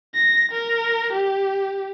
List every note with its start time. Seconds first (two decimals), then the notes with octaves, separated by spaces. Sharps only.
0.15 A#6
0.52 A#4
1.13 G4